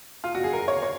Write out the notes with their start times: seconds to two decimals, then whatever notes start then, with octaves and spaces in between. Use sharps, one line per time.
0.24 F4
0.35 F#4
0.44 G#4
0.53 A#4
0.68 C#5
0.83 C#5